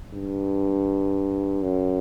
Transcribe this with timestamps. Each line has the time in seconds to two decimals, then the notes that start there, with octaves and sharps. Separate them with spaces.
0.14 G2
1.63 F#2